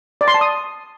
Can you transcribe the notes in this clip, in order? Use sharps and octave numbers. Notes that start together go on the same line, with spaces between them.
D5
C6
A5
D#6